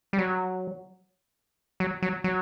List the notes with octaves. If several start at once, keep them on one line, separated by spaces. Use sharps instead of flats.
G3
F#3
F#3
F#3
F#3